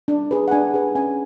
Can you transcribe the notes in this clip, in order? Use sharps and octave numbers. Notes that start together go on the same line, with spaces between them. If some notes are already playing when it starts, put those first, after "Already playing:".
D4
G#4 B4
F#5
D4 G#5
G#4 B4
C#4 G#5